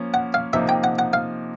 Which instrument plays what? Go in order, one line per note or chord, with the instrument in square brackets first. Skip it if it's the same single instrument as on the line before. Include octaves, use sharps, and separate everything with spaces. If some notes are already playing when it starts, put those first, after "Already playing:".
Already playing: [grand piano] F3 A#3 C#4
[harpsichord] F#5
F5
[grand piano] C3 F3 A#3 D#4 [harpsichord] E5
[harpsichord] G5
F#5
F#5
F5